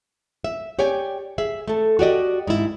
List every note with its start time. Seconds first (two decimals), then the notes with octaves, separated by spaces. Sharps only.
0.44 E5
0.79 G4 C#5 D5 G5 G#5
1.38 G#4 E5
1.68 A3 A4
1.99 F#4 G4 D5 D#5
2.47 G#2 E4